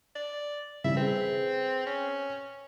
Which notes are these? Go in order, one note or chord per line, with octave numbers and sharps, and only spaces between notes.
D5
C#3 E3 G3 E5
C4 G#4 B4
C#4